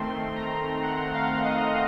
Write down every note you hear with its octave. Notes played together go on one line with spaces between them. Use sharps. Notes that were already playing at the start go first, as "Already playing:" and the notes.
Already playing: D#3 A3 C4 C6
A#5
F#5
F5
D#5